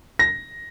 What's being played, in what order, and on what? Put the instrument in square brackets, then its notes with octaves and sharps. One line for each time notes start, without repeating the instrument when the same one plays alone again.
[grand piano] A#6